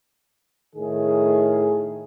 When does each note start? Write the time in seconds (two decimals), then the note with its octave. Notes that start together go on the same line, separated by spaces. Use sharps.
0.75 A2 D#3 G#4